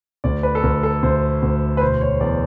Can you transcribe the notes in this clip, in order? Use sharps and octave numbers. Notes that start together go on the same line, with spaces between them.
D2 D5
B4
A4
D2 A#4
A4
D2 C5
D2
B4
E1 C5
C#5
E2 D5